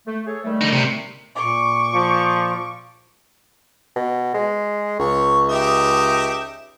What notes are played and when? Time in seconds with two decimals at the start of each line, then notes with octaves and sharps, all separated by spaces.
0.06 A3
0.26 G#4 A4 C#5
0.44 D#3 G3 A3
0.61 D3 D#4
0.73 C3
1.35 A#2 C#6 D6
1.94 F3
3.96 B2
4.34 G#3
4.99 C#2 C#5
5.49 D#4 G4 E5